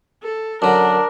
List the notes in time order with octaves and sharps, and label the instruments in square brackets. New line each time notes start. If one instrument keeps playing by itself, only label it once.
[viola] A4
[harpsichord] F#2 D3 [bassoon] D4 [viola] A#4